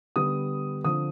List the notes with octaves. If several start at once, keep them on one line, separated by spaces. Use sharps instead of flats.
D3 G3 B3 D#6
D3 F3 C4 D#6